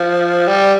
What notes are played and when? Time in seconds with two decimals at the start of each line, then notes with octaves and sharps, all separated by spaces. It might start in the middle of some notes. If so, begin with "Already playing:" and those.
Already playing: F3
0.48 G3